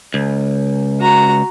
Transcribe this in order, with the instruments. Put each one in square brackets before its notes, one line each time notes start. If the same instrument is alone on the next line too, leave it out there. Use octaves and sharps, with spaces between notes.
[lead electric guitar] C#2
[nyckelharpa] F#4 A#5